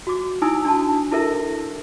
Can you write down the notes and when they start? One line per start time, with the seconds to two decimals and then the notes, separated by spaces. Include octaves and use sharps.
0.07 F#4 D6
0.42 D#4 E4 G#5 D#6 E6
0.65 D4 F#4 A5
1.12 E4 A4 A#4 E5